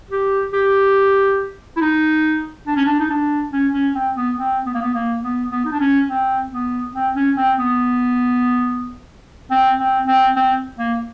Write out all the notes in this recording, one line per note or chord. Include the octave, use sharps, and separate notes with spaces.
G4
G4
E4
D#4
D4
C#4
D4
D#4
D4
C#4
C#4
C4
B3
C4
B3
A#3
B3
A#3
B3
B3
D#4
D4
C#4
C4
B3
C4
C#4
C4
B3
C4
C4
C4
C4
A#3